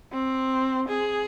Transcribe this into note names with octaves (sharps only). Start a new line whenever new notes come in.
C4
G#4